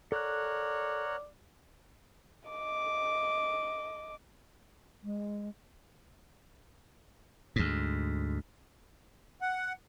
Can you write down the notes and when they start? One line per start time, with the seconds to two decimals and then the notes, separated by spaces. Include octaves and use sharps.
0.12 A4 A#4 C#5 D5 F#5 F#6
2.49 D#5 D6
5.03 G#3
7.56 D2 G#2
9.41 F#5